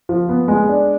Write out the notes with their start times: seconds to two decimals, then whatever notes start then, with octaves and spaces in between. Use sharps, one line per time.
0.09 F3
0.29 B3
0.48 G#3
0.69 D4